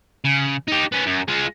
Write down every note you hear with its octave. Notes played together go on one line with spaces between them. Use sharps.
C#3
D#4 G4
B3 C#4
F#2
G#3 F4